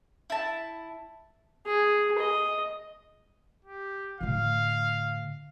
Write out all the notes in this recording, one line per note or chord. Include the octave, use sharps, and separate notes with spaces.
E4 A5
G#4
D#5
G4
A2 D3 F5